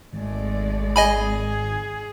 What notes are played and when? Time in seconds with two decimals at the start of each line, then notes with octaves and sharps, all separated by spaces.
0.13 G#1 G#3 A3 D5
0.96 G#4 D#5 G#5 B5